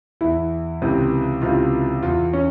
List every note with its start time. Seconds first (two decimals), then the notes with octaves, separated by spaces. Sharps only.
0.21 E2 E3 E4
0.82 C#2 C3 E3
1.42 C#2 C3 E3 F4
2.03 E2 E3 F4
2.33 C#4